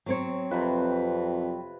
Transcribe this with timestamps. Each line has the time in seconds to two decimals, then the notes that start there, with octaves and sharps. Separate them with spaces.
0.06 F#3 C4 C#5
0.51 F2 C3 B4